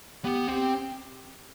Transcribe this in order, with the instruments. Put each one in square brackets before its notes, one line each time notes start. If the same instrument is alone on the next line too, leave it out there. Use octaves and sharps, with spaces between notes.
[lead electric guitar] B3 [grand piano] G4
[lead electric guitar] C4 [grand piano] G4